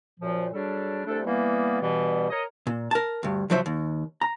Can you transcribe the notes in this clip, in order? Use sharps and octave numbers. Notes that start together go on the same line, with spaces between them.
F#2 A#2 F3
F#3 G3 D4 G#4 A4
C2 A3 D4 A4
E3 G3 A#3 B3
G2 B2 E3 G3 B3
A#4 C#5 D#5
A#2
A#4 A5
D2 G2
C#2 F3 F#3 C5 E5
D#2
A#5